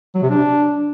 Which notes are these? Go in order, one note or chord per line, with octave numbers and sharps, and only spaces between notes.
F#3
C3
D4